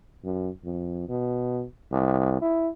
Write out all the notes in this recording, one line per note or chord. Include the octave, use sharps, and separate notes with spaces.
F#2
F2
B2
C2
E4